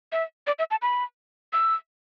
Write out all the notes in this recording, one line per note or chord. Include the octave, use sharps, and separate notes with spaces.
E5
D5
E5
A5
B5
E6